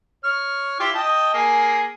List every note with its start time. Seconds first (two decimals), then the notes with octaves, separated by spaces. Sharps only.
0.24 C#5 F6
0.80 E4 F4 G4
0.95 D#5 G5 A5
1.34 A#3 G#4